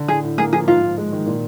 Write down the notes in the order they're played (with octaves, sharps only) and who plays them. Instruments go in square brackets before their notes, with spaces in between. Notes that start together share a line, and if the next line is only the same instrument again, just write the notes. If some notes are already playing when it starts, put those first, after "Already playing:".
Already playing: [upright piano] D3
[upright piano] A2 [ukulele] G#4
[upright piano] A2
[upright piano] A#3 [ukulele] G#4
[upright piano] F3 [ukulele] G#4
[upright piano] G#2 [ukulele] F4
[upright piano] G#2
G#3
D#3
A#2